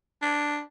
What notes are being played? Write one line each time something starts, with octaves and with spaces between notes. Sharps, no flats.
D4